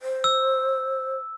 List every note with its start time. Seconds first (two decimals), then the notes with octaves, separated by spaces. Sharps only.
0.02 C5
0.24 E6